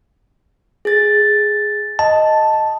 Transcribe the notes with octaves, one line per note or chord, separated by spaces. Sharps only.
G#4 A6
D#5 A5